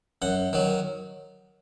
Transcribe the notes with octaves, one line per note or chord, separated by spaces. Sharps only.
F#2 F#5
D#3 F#3